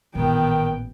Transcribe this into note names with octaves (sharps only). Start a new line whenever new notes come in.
A1 A#2 D#3 B3 G5